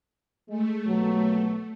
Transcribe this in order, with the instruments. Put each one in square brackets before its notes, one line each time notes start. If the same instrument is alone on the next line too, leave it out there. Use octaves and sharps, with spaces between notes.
[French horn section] G#3 [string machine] A3
[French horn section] D#2 B2 F#3